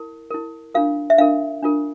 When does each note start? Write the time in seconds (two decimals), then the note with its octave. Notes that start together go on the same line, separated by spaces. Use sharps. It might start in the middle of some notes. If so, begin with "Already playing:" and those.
Already playing: E4 A#4
0.30 E4 A#4
0.74 D4 F4 A#4 F5
1.10 E5
1.18 D4 F4 A#4 F5
1.63 D4 F4 A#4